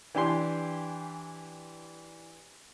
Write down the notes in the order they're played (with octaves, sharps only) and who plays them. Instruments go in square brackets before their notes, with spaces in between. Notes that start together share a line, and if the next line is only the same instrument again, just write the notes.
[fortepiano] E3 D4 G4 G#5 C6